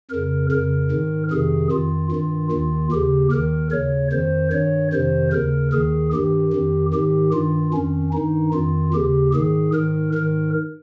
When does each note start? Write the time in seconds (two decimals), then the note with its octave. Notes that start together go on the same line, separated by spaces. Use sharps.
0.10 F2 C#3 A#4
0.51 F2 C#3 A#4
0.91 G#2 D#3
1.31 F2 C3 D#3 G#4
1.71 F2 D#3 F4
2.11 G2 D#3 F4
2.51 D#2 D#3 F4
2.92 D#2 C#3 G4
3.32 D#2 D#3 A#4
3.71 D#2 C#3 C#5
4.12 F2 D#3 C5
4.52 G2 D#3 C#5
4.93 F2 C3 D#3 C5
5.33 D#2 C#3 A#4
5.73 D#2 D#3 G#4
6.13 G2 D#3 G4
6.53 F2 D#3
6.93 G#2 D#3 G4
7.33 G2 D#3 F4
7.73 F2 D#3 C#4
8.14 G2 D#3 D#4
8.54 F2 D#3 F4
8.94 D#2 C#3 G4
9.34 G#2 D#3 G#4
9.74 G#2 D#3 A#4
10.14 G#2 D#3 A#4